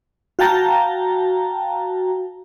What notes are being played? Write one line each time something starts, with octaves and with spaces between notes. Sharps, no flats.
F#4 F5 G5 A5 A#5